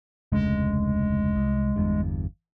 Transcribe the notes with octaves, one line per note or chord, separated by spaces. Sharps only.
F1 D2 C#3 G#3
C2
G1 E2 G2